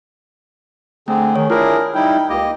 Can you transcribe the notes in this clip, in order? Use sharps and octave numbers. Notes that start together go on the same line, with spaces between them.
D3 A3 C4 G#4
D#3 G#4 C#5
D4 E4 F4 G#4 A#4
G3 D#4 E4 G5
C#2 A#3 G4 D#5